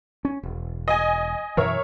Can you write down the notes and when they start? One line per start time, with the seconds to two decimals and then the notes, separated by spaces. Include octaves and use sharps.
0.25 C#4
0.43 E1
0.88 D#5 G#5
1.57 F#2 B2 E3 A#4 C#5 E5